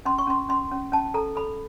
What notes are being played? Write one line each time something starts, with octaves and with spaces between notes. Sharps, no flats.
C#4 C6
C#6
C#4 C6
C#4 C6
C#4
C#4 A5
A4 A#5
A4 B5